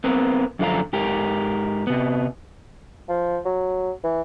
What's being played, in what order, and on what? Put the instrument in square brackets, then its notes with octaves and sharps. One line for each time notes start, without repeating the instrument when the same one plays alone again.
[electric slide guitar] B3 C4 A#4
F#2 D3 F3 F5 A#5
G#2 G4 A#4
C3 B3
[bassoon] F3
F#3
E3